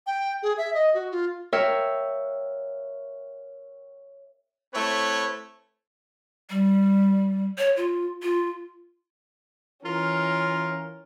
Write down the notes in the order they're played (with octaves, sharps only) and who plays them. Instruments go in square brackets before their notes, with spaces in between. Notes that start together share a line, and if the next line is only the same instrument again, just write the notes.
[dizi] G5
G#4
E5
D#5
F#4
F4
[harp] A#4 C#5 E5 F5 G5
[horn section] A3 C4 E4 B4 C#5
[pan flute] G3
C#5
F4
F4
[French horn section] E3 [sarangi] C#4 [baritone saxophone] F4 [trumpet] A#4